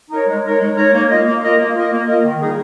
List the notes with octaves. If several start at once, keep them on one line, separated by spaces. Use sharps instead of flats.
D#4 A#4 C#5
G#3
D#4 A#4 C#5
G#3
D#4 A#4 C#5
A#3
F4 A#4 D#5
A#3
F4 A#4 D#5
A#3
F4 A#4 D#5
A#3
F4 A#4 D#5
D#3
G3 A#3 D#4 G#4